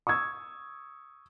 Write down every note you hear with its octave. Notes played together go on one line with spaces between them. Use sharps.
C#6 D#6 E6 G#6